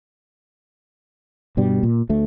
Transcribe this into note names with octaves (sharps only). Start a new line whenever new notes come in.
G2 B2 G3
A#2
D2 A3